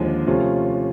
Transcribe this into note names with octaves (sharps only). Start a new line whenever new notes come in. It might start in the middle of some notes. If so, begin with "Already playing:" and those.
Already playing: D#2 D3 F3 G#3
C3 F3 A3 C#4 F4